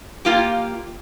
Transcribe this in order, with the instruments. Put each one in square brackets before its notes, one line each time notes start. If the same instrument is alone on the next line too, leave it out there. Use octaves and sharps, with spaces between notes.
[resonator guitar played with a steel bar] A#3 F4 G4